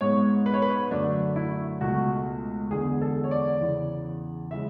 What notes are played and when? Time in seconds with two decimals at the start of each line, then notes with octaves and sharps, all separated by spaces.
0.01 G#2 G#3 B3 C#5
0.46 B4
0.54 C#5
0.62 B4
0.91 F#2 D3 F#3 A3 D4
1.36 E4
1.81 C#2 B2 A3 F#4
2.71 E2 D3 G#3 B3 G#4
3.02 A4
3.24 C#5
3.31 D5
3.61 E2 C#3 E3
4.51 C#3 E3 G#3 E5